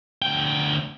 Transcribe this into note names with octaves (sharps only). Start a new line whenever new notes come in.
D2 G5